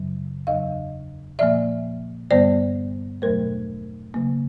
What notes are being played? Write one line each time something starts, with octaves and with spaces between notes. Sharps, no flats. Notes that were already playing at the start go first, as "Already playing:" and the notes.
Already playing: F#2 C#3 F#3
E2 C#3 F#3 D#5 F5
A#2 F3 A#3 D5 E5
G2 D3 G3 B3 C5 D5
E2 B2 F#3 A3 A#4 C5
C#3 F#3 A#3